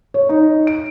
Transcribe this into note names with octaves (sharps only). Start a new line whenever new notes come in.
C#5
D#4
D7